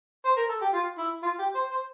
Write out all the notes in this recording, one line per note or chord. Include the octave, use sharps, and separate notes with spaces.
C5
A#4
A4
G4
F4
E4
F4
G4
C5
C5